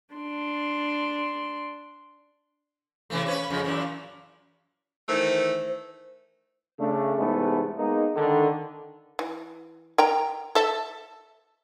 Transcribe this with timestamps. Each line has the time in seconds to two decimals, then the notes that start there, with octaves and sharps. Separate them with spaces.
0.14 D4 C6
3.10 C3 E3 A3
3.26 C#4 B4 C#5
3.50 F2 C#3
3.64 F#2 A#2 E3
5.09 D#3 E3 A3 C5
6.80 C#3 A3 D4
7.18 E2 G#2 C3 G#3 A3 B3
7.78 G#3 A#3 B3 D#4
8.16 D3 D#3
9.19 E3
9.98 A#4 G5 A#5
10.55 A4 E5